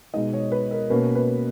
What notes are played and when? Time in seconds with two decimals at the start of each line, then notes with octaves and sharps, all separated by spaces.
0.14 B2 G#3 D#4 D#5
0.33 C#5
0.52 B4
0.71 A#4
0.90 B2 A#3 C#4 B4
1.15 B4